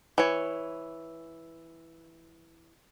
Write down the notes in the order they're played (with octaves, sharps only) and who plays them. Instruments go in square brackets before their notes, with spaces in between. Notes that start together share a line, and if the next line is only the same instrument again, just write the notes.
[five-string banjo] E3 C#5